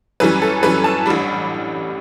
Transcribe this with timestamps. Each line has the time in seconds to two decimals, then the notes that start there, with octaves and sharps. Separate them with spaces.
0.20 F#2 E3 G3 C#4 B4
0.42 A4
0.63 F#2 E3 G3 C#4 B4
0.84 A5
1.06 A1 A2 G3 D4 B5